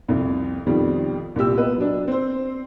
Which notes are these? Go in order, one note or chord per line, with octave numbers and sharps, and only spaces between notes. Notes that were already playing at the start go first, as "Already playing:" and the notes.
C2 F2
F2 B2 D#3 F3 G3
C2 A#2 G4 E6
A#3 B3 B4 D#5
F#3 D4
C4 C5